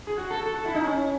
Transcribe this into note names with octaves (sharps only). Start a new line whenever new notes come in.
G#4
F#4
A4
A4
F#4
E4
D#4
C#4